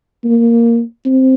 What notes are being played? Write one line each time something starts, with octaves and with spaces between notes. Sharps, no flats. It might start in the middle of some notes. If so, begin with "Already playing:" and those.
A#3
C4